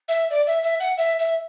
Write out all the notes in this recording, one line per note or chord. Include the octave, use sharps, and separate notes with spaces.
E5
D5
E5
E5
F#5
E5
E5